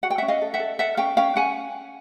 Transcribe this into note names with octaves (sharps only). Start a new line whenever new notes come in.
F#4 F#5
G5
E5 F#5
C#4
D#5 F5
A4
E5 F#5
A4
A4 E5 F#5
C#4 F5 G5
C#4 F5 G5
C#4 F#5 G#5